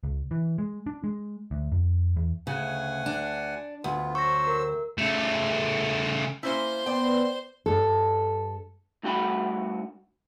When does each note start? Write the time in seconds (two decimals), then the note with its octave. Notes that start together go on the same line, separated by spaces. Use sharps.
0.03 C#2
0.31 E3
0.58 G#3
0.86 D4
1.04 G#3
1.51 D2
1.72 F2
2.16 E2
2.47 D2 C#3 F#5 G#5
3.06 D4
3.84 D2 B3 F4
4.15 F#3 C5 C#6 E6 A#6
4.47 A#4
4.98 C#3 A3
6.43 A#3 C#4 E4 C5 C6
6.86 B3 D5 G5
7.66 G2 A4
9.03 G2 A3 F#4 G5 B5